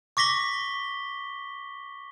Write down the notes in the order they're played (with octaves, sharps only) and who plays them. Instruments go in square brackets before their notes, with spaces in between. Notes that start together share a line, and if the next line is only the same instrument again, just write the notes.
[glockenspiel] C#6 D6 A#6 B6 G7